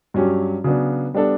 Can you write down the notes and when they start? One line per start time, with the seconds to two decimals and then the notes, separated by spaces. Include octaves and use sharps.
0.14 G2 F#3 C#4 G4
0.64 C#3 F#3 B3 D4
1.14 G3 B3 D4 A4